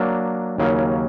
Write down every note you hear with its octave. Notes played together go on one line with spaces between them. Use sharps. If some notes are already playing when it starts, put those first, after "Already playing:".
Already playing: F#3 A#3 D4
D#2 C#3 F#3 A#3 C#4